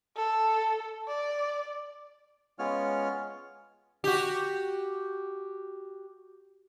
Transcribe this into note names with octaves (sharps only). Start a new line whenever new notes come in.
A4
D5
G#3 B3 C#4 F4 C#5 F6
F#4 G4